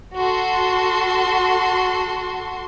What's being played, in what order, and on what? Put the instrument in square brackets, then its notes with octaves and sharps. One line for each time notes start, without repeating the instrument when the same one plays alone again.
[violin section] F#4 A4 C6